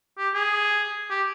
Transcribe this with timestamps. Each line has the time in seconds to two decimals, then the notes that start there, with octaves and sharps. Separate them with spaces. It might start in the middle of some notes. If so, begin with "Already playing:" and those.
0.18 G4
0.34 G#4
1.10 G4